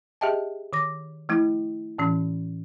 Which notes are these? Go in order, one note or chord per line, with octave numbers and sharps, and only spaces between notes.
G4 G#4 D#5 E5 G5 A5
D#3 D6 A#6
F3 A3 E4
A2 E3 C#4